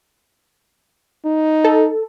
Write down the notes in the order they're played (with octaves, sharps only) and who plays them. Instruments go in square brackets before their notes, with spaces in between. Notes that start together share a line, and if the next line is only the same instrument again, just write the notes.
[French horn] D#4
[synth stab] A4